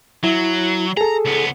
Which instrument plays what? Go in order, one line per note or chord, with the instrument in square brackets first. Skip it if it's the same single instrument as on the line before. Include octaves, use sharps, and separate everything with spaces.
[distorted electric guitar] F#3 [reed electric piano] E4
[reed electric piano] G#4 A4 [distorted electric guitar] A#5
[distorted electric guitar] C#2 B3